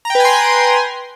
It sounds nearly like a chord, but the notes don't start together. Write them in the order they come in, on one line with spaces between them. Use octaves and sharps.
A#5 G5 B4 G#5 C6